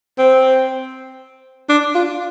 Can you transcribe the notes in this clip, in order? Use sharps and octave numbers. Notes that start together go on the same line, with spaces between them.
C4
D4
F4